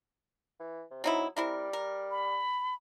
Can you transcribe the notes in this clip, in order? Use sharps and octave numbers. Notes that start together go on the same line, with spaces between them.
E3
C3
F#3 C4 D#4 E4
G3 C4 E4 A#4
A#4
B5